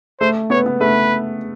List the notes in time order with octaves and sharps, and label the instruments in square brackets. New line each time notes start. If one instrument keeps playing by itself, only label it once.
[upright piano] A3 [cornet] C5
[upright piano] B3 [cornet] C#5
[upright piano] B3
[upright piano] A3 [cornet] B4